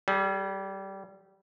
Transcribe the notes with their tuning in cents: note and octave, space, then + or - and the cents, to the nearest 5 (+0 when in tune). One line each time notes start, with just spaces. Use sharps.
G3 -15 G#4 +35